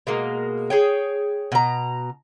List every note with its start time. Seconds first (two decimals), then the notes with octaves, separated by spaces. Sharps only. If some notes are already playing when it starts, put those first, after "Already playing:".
0.07 B2 G#3 A#3
0.70 G#4 C#5 G5
1.52 B2 A#5